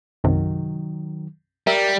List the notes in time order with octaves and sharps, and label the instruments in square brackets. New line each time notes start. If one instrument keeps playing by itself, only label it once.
[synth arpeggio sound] B1 F#2 C3 [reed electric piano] D#3 F#3
[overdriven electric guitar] G3 [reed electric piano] A#4 [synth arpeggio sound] E5